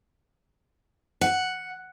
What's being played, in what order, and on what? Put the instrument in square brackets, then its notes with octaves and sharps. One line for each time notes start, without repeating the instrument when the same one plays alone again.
[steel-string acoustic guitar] F#5